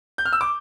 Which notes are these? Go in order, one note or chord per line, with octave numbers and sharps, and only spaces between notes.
G6
F6
E6
D6